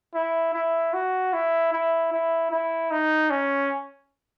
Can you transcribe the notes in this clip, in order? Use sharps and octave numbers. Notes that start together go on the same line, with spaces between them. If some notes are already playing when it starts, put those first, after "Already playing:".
E4
E4
F#4
E4
E4
E4
E4
D#4
C#4